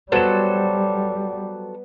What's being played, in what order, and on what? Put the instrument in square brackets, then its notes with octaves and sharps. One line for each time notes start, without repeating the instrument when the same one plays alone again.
[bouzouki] F#3 A4 C5 [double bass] G3 [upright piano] B3 E7